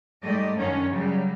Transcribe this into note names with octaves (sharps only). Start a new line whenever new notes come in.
G#2 G3 A3 D5 D#5
F#2 D3 D#3 C#4 C#5
C#3 F#3 G3